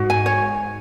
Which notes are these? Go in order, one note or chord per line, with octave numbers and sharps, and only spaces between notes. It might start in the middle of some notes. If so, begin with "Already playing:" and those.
Already playing: G#2 F#4
G#5
C#5